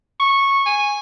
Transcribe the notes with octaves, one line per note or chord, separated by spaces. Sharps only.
C#6
G#5